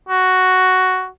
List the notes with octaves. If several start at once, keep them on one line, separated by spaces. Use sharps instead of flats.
F#4